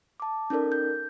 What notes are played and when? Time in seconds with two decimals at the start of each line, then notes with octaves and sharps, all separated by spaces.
0.20 A5 D6
0.50 C#4 D#4 A4 A#4 D5
0.72 G6